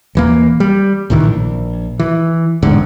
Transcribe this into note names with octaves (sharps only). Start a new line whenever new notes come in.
D#1 E3 A#3
G3
C2 A2 D#3 E3
A#1
E3
E1 A1 G#2 D3